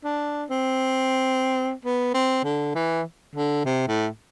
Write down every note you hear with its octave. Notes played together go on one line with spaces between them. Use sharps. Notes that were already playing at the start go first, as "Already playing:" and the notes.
D4
C4
B3
C4
D3
E3
D3
C3
A2